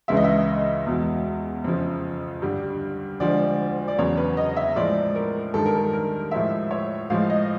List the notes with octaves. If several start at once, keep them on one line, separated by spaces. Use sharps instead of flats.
C#2 C#3 E3 G#3 E5
D#5
E5
E2 B2 G#3
F2 C#3 F3
G2 D3 G3
D2 D3 F3 G#3 D5
D5
E2 C#3 F#3 C#5
B4
D#5
E5
A2 F3 G#3 D5
A#4
G2 D#3 G#3 A4
A#4
A4
A#4
A2 F3 G#3 E5
C#5
A2 F3 G#3 F5
D#5